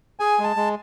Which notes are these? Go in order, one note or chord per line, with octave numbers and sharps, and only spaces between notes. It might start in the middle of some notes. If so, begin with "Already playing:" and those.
G#4 G#5
G#3 A5
G#3